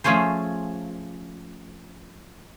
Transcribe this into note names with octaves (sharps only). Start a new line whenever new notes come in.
F3 A3 C#4 G#4 C5